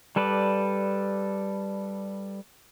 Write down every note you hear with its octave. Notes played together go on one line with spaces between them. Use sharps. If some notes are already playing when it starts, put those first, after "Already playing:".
G3 A4 B4 D5